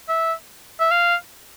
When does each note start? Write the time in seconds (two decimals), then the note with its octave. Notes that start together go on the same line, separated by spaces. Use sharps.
0.08 E5
0.80 E5
0.91 F5